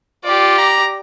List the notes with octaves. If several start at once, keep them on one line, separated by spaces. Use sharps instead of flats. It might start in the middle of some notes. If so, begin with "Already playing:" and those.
F4 G4 D5
A#5